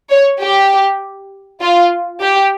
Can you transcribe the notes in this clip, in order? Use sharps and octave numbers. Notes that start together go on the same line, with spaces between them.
C#5
G4
F4
G4